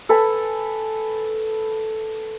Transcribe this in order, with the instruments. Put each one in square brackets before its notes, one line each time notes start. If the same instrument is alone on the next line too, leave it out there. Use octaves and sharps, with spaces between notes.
[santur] A4 B4 G#5